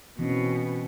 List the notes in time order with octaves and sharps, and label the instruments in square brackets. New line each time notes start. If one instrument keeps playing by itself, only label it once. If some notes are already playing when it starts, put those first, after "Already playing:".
[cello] B2 [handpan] E3 C4 C#4